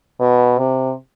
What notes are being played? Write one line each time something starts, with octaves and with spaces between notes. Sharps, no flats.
B2
C3